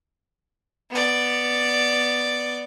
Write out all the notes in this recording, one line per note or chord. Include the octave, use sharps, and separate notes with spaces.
B3 D5